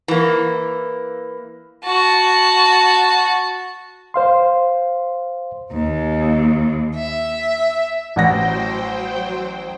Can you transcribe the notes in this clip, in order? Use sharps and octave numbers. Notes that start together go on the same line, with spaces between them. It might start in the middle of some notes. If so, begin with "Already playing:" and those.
E3 A#3
F#4 A5
C5 F5 C6
D#2
E5
A1 F#3 C5 F#5 G5 A#6